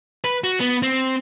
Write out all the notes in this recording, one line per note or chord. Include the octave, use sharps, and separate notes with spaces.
B4
F#4
B3
C4